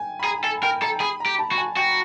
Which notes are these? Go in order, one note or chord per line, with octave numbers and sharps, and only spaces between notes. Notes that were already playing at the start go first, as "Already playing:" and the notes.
Already playing: G5 G#5
B5
G#4 A#5
A4 G#5
A#4 G5
A4 A#5
G#4 B5
A#5
G4
A5
F#4
G#5
F#4 G5